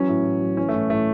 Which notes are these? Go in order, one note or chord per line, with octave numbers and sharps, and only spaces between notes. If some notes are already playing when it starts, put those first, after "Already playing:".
Already playing: E3 F#3 C#4
A2
A2
F#3
E3 C#4
A3
A2
A2 A3